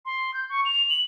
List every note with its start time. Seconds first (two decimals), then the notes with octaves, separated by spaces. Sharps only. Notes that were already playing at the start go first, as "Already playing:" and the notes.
0.05 C6
0.34 G6
0.49 C#6
0.65 F7
0.90 F#7